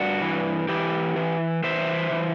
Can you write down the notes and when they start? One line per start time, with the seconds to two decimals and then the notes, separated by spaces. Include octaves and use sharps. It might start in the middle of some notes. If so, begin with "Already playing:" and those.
Already playing: G2 D4 F#4
0.22 E3
0.69 E3 E4 G4
1.16 E3
1.64 E3 C5 E5
2.11 E3